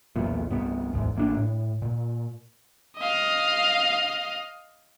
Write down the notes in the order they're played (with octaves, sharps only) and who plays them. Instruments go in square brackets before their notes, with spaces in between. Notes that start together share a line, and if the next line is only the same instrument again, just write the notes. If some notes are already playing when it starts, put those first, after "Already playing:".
[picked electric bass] B1 E2 A#2
C2 G2 B3
D1 G#1 E2 G#2
A1 A#3 D4
A2
A#2
[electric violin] D#5 F5